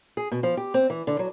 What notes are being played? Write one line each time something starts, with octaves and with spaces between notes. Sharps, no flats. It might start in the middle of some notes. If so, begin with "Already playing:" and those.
G#4
B2
F3
G4
C4
E3
D3
F#3